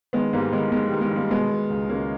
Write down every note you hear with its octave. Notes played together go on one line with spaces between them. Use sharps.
D#3 G#3 B3
G#2 G3 A#3
D#3 G#3 B3
D#3 G#3
D#3 G3
G#3
D#3 G3 A#3
B2 G#3 B3
B2
C#2
C#2 A#3 C#4